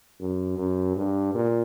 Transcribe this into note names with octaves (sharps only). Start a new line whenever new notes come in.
F#2
F#2
G2
A#2